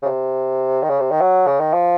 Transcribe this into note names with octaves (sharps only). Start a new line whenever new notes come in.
C#3
C3
D#3
C#3
C3
D#3
F#3
C#3
D#3
F3